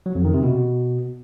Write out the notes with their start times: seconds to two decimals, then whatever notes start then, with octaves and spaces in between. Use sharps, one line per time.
0.06 F#3
0.15 F2
0.25 D#3
0.34 C3
0.43 B2